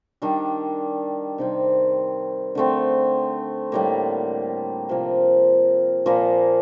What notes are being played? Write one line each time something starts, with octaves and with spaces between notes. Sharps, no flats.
D#3 G3 D4
C3 D#3 G3 C4
D3 A3 C4
A2 G3 A#3
C3 F3 A#3
A#2 F3 A#3